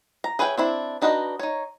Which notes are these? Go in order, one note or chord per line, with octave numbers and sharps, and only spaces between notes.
A#5
G#4 B4 C#5 E5 G5
C4 D4 E4
D4 D#4 F#4 B4 D#5
D#4 C#5